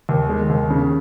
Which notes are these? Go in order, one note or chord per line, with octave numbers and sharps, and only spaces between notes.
D#2
G#3
D#2
C#3